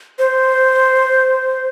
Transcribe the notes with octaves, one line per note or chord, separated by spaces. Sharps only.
C5